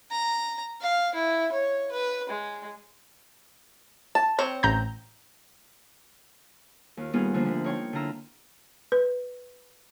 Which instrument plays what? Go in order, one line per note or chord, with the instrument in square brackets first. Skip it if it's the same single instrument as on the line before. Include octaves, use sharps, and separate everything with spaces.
[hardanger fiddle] A#5
F5
E4
C#5
B4
G#3
[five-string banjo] A5
C4 C#5
[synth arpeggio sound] A1 A#5 G6
[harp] D#2 F4
G3 A#3 B3 D#4 F4 G#4
D3 F3 A#3 C5
D2
D#4 F4 C#5 G5 C#6
D3 E4 F4 A#5 E6
[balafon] B4